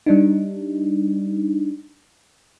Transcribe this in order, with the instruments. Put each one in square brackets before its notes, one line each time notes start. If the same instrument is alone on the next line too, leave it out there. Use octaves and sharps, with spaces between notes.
[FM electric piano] G3 D4 D#4